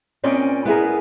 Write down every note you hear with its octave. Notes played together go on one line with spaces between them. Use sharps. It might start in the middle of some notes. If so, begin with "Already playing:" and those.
A#2 C4 C#4 D5 D#5
B3 E4 G#4 A#4